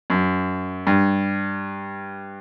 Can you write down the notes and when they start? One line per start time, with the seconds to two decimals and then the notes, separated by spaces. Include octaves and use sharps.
0.10 F#2
0.87 G2